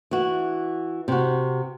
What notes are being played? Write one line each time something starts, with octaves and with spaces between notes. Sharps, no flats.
E3 F#4
C3 F#4